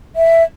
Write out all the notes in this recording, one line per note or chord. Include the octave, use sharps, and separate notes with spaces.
E5